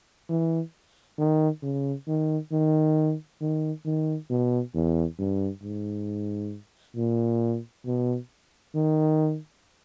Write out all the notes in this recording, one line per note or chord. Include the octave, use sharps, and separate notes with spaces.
E3
D#3
C#3
D#3
D#3
D#3
D#3
B2
E2
G2
G#2
A#2
B2
D#3